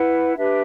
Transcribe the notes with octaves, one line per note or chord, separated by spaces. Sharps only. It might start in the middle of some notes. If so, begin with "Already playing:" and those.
Already playing: E4 B4 F#5
D4 G4 B4 E5